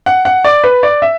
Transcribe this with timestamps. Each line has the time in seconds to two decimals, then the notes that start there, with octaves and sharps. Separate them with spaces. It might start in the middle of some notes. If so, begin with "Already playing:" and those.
0.06 F#5
0.25 F#5
0.44 D5
0.64 B4
0.83 D5
1.02 E5